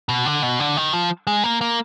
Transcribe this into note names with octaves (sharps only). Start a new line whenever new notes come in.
B2
D3
B2
D3
D#3
F3
G#3
A#3
A#3